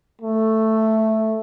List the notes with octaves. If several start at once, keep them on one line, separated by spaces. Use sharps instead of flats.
A3